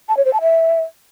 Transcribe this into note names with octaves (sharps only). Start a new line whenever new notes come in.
A5
C#5
C5
A5
E5